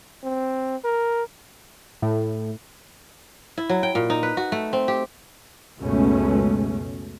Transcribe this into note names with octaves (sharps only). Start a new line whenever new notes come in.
C4
A#4
A2
E4
F#3
G5
A#2
D#4
B4
F#4
A3
C4
G4
C#2 F#2 B2 G#3 A3 C#4